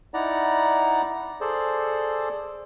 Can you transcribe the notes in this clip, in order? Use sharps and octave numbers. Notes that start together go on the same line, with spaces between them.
D#4 E4 D5 F#5 A#5
G#4 A4 C5 D5